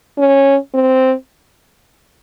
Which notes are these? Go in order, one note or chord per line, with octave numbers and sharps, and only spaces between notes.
C#4
C4